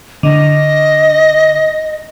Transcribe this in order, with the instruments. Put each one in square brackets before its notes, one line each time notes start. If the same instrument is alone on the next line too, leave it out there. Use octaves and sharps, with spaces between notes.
[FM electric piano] D3 [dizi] D#5